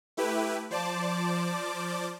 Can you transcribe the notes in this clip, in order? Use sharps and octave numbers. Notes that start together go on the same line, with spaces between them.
A3 E4 G4 B4
F3 C5 D5 A5 D6